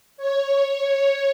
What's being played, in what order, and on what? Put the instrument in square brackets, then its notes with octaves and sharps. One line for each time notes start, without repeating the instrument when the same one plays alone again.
[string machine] C#5